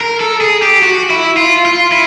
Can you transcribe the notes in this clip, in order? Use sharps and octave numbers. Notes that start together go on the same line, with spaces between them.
A#4
A4
G#4
G4
F#4
E4
F4
F4
E4